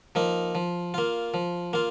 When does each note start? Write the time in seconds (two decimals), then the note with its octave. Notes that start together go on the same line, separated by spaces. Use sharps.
0.15 F3 A#3 D#4
0.55 F3
0.94 A#3 F4
1.34 F3
1.73 A#3 F4